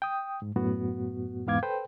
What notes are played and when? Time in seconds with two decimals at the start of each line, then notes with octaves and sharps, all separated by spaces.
0.02 G5 D#6
0.42 G#2
0.56 F#2 A2 B3 F#4
1.47 E2 G#2 B3 F5 D6 G#6
1.63 A4 B4 C5 G5